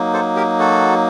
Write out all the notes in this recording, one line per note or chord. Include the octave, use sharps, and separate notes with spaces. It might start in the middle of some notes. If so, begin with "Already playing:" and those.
Already playing: F#3 A#3 D#4
A4 C5
G4 A#4
F#4 A4